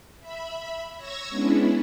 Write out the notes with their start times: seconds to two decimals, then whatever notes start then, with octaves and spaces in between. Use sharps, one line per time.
0.20 E5 B5
0.97 C#5 C#6 E6 G#6 A#6
1.29 G#3 B3 C#4 D4 E4